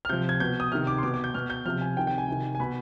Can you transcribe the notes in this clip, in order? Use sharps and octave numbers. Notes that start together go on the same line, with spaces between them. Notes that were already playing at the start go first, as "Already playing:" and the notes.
F6
C3 F3 G6
G#6
B2 G6
D#6
C3 D#3 F6
D6
C6
B2 D6
D6
G6
B2 F6
G6
C3 F3 F6
G#5
C3 D#3 G5
G5
G#5
C3 D#3
G#5
B2 B5